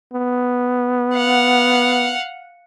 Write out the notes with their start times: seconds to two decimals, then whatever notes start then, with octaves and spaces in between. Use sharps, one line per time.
0.14 B3
1.15 F5 F#5